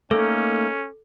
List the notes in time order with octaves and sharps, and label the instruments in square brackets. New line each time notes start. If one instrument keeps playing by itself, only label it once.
[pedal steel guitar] A3 A#3 D#4 [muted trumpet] C#4 [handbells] A4